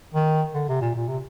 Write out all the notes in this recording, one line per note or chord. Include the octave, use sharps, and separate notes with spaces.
D#3
D3
C3
A#2
A#2
C3